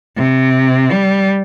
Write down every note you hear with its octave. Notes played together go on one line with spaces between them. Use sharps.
C3
G3